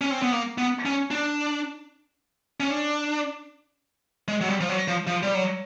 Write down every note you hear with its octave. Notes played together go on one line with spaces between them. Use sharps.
C#4
C4
B3
A#3
B3
C#4
D4
C#4
D4
G#3
F#3
G3
F3
F#3
F3
F3
G3
F#3